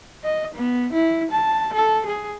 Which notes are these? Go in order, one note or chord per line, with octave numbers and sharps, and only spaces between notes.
D#5
B3
E4
A5
A4
G#4